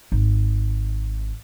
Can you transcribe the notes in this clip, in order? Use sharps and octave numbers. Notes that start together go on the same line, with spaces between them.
G#1